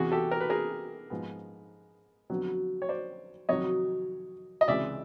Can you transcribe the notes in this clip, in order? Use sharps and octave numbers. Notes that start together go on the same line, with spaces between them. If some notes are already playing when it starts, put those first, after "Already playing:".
Already playing: E2 C3 E3 F#4 G#4
G4 A4
A#4
B4
G#4 A#4
G#2 F3 G#3 B3
F2 D3 F#3 B3
C#5
C5 D5
F2 C3 D#3 F#3 C#5 D#5
D#5
C#2 C3 E3 G#3 D5 E5